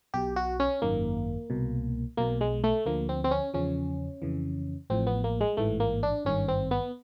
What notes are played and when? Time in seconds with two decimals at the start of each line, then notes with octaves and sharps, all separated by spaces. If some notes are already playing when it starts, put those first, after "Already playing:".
0.14 B1 B2 G4
0.36 F#4
0.60 C#4
0.82 G#1 F#2 D#3 A#3
1.50 C2 B2
2.17 B1 B2 A#3
2.41 G#3
2.64 A3
2.86 D2 D3 F3 A#3
3.09 C4
3.24 C4
3.31 C#4
3.54 E2 C#3 F3 C#4
4.22 F2 C#3 E3
4.90 A1 A2 F3 C4
5.07 B3
5.24 A#3
5.41 G#3
5.57 A1 G#2 E3 A3
5.80 A#3
6.03 D4
6.25 G#1 G2 D#3 C#4
6.48 C4
6.71 B3